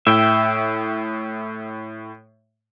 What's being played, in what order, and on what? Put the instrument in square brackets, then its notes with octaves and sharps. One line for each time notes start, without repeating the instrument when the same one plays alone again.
[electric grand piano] A2 [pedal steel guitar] E5 G5